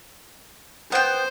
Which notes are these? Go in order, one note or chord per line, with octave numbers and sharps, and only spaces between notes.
B3 C5 G5